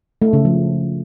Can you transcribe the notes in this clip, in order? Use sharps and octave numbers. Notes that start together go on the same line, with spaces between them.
A3
C#3
F3